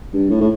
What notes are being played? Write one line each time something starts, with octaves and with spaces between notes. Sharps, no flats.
G2
A2
A2